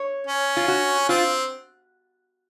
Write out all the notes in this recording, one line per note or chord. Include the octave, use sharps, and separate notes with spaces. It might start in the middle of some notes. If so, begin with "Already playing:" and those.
Already playing: C#5
C#4
F4
F#4
C4 F4